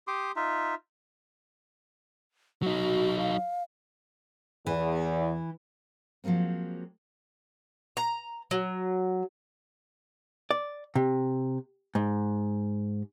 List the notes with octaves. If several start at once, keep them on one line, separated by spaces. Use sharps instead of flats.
G4 C6 D6 D#6
D#4 F4 E5
F#3 D#4 F#4
F5
E2 E3
F3 F#3 G#3 A#3 C4
A#5
F#3
D5
C3
G#2